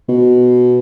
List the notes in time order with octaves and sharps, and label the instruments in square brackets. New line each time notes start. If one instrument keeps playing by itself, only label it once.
[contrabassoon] B2